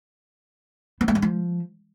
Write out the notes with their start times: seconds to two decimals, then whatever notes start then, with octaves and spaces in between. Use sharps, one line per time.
1.01 B3
1.08 A3
1.15 G#3
1.22 F3